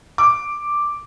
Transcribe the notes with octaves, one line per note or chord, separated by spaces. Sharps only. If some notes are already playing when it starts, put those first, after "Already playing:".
D6